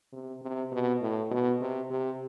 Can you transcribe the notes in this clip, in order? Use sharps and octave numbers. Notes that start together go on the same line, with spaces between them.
C3
C3
B2
A2
B2
C3
C3